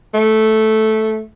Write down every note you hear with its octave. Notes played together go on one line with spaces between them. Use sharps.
A3